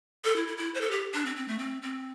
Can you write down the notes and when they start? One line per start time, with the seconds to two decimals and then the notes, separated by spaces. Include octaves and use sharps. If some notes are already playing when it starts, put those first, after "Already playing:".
0.24 A4
0.36 E4
0.47 E4
0.57 E4
0.74 C5
0.81 A4
0.91 G4
1.14 D4
1.25 C4
1.36 C4
1.48 A3
1.58 C4
1.82 C4